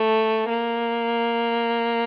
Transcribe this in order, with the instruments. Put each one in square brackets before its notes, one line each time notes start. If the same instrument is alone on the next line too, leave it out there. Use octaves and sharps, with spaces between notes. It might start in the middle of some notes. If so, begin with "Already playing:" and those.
Already playing: [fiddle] A3
A#3